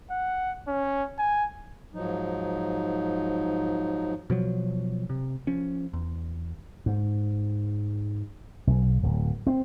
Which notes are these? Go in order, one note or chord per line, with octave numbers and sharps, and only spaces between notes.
F#5
C#4
G#5
G#2 F3 F#3 D#4
B2 F3 F#3
C3
F3 C#4
E2
G#2
B1
D1
C4